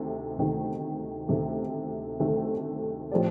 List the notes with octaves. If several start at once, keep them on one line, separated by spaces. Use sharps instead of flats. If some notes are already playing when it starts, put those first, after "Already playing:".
Already playing: D2 C3 D#3
D2 C3 D#3 A3
D2 C3 D#3 A3
D2 C3 D#3 A3
A2 F3 C4 G4 D5